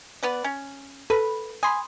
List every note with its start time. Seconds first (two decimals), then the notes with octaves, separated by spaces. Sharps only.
0.23 B3 B4 D5
0.44 C#4
1.10 A4 B4 B5
1.63 G#5 B5 C6 D#6